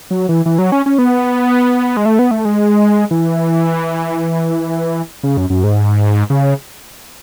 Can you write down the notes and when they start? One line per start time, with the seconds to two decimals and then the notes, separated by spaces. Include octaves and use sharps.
0.11 F#3
0.29 E3
0.46 E3
0.59 F#3
0.72 C#4
0.86 C#4
0.98 B3
1.97 G#3
2.06 A3
2.19 B3
2.31 A3
2.45 G#3
3.11 E3
5.23 C#3
5.37 F#2
5.50 F#2
5.64 G#2
6.30 C#3